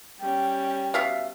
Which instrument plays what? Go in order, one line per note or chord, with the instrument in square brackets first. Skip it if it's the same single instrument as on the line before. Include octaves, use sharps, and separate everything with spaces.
[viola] G3 C#4 [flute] G5
[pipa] B2 E5 F5